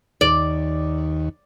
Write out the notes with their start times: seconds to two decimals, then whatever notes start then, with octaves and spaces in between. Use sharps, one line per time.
0.21 D#2 D5